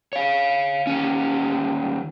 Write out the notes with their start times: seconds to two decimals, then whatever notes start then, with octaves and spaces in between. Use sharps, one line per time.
0.13 C#5 F5
0.87 D#2 C#4